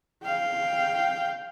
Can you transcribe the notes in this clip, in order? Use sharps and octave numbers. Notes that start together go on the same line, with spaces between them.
F5 G5